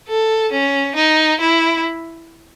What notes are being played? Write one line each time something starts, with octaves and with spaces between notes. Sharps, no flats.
A4
C#4
D#4
E4